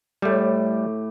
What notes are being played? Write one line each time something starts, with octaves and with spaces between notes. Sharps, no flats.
A2 G3 A3 G4